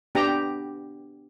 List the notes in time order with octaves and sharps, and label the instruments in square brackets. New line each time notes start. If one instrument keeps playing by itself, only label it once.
[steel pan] B3 D4 G4 G5 A#5